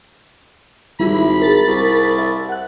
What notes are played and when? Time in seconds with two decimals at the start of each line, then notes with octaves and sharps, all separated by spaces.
1.00 G#1 G3 E4 B5
1.42 G#4 A#4 A6
1.68 C2
2.19 E5
2.49 F#5 F#6